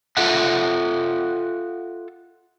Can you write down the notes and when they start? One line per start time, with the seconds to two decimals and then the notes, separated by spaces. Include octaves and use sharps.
0.17 F4 A4 E5 F#5